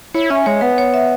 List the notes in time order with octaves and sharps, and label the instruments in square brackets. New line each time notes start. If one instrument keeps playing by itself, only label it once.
[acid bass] E4 [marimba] C#5
[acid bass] C#4 [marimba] E5
[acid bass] G#3 [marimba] C#5
[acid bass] B3 [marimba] B4
[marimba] C#5
E5